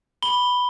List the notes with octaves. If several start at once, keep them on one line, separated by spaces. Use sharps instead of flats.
B5 G7